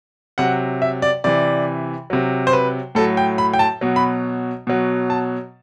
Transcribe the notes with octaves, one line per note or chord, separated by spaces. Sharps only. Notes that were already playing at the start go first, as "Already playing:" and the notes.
C3 F#3 F#5
E5
D5
C3 E3 D5
C3 F#3
C5
B4
A2 F#3 A4
G5
B5
G5
A5
B2 F#3
B5
B2 F#3
A5